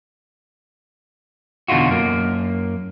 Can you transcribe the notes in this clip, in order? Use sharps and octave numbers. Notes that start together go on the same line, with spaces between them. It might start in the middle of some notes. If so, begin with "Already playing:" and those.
E2 B2 D3 D#4 F4 F#4
F#2 A#3